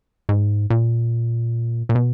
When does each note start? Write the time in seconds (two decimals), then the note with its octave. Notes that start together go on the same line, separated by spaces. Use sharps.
0.29 G#2
0.70 A#2
1.89 A#2
1.95 B2